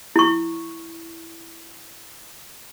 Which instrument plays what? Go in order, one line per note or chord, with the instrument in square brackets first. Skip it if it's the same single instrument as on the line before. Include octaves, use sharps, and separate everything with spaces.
[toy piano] E4 C#6